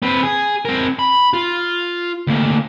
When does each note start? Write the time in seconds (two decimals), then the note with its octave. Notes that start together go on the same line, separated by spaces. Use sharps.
0.02 C4 B4
0.23 G#4
0.65 C4 A#4
0.99 B5
1.33 F4
2.27 D2 A#3